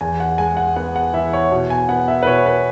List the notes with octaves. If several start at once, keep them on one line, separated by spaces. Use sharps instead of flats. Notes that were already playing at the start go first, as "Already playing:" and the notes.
E2 G#5
F#5
G#3 G#5
F#5
B3 F#5
F#5
E3 E5
C#5
B2
G#5
B3 F#5
E5
B4
B2 C#5
B4